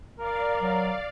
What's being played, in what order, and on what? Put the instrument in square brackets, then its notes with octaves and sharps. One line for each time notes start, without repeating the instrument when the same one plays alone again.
[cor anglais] A#4 [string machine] D5 F5
[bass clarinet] F#3